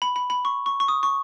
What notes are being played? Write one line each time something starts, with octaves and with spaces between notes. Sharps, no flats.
B5
B5
B5
C#6
C#6
C#6
D#6
C#6